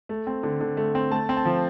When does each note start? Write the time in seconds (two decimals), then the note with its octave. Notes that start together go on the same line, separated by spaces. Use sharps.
0.09 A3
0.27 C4
0.43 D3
0.61 D3
0.77 A3
0.95 C4
1.11 A3 A5
1.29 C4
1.37 A5
1.45 F3